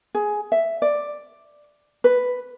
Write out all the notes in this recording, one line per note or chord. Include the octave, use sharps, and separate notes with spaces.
G#4
E5
D5
B4